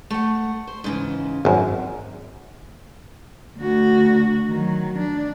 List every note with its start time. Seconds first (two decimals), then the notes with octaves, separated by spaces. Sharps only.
0.10 A3 F#5
0.67 C5
0.84 G#2 C#3 E3
1.45 G#1 F#2
3.58 D2 F#4
4.49 D#3 F#3
4.99 D4